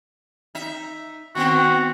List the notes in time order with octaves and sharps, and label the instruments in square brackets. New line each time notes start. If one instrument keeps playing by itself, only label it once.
[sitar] D#4 E5
[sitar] D#3 B3 C4 [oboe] F#4